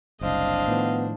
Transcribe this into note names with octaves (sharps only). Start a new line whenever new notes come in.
F#1 C2 D4 C5 D#5 F5
A2 D#3 F3 B3